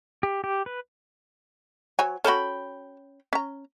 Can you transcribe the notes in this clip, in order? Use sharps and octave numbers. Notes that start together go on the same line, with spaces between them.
G4
G4
B4
F#3 C5 C#5 G#5
C#4 F#4 A4 G5 B5
C#4 A#5